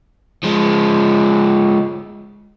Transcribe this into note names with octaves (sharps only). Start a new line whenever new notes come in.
F3 G#3